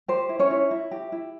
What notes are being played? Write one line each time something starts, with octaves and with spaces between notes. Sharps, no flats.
G4 C5
E4
C#4 C#5
E4
E4
G4
E4